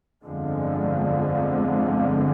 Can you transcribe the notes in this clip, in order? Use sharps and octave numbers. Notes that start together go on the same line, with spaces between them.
G1 F2 D3 F3 G#3